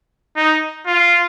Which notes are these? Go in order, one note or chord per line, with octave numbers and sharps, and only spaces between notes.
D#4
F4